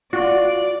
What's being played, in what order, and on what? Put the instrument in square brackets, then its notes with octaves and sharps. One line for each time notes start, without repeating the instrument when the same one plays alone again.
[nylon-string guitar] F4 [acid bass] F#4 [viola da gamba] D5